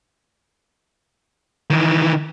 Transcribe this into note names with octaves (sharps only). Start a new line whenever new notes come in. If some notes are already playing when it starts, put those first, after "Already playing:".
D#3 E3